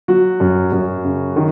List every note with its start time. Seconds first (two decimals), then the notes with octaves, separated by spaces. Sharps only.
0.08 F#3 F#4
0.40 F#2
0.72 F#2
1.04 C#3
1.36 D#3